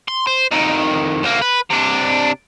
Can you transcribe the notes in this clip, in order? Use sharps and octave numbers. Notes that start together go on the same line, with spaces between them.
C6
C5
F2 D#3
D2 A#3
B4
C3 D4